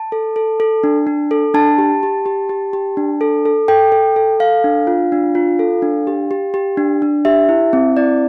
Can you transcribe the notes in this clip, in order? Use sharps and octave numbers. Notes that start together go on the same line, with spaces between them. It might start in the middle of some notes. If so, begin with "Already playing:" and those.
Already playing: A5
A4
A4
A4
D4
D4
A4
D4 A5
G4
G4
G4
G4
G4
D4
A4
A4
A4 G5
A4
A4
A4 F5
D4
F4
D4
F4
A4
D4
G4
G4
G4
D4
D4
G4 E5
E4
C4
E4 D5